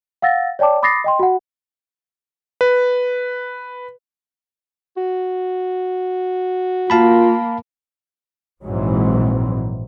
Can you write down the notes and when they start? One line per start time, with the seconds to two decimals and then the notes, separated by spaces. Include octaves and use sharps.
0.22 F5 F#5 E6 A6 A#6
0.59 C#5 D5 G5 A5 D6
0.83 B5 D6 D#6 A6 A#6 C7
1.04 D#5 G5 C6
1.19 F#4 F#5
2.61 B4
4.97 F#4
6.90 A#3 F4 F5 A5 B5
8.62 A#1 G#2 E3 F#3 C4